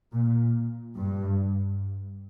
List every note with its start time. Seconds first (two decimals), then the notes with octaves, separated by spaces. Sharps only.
0.13 A#2
0.97 G2